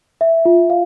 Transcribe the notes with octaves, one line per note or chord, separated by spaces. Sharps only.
E5
F4
F5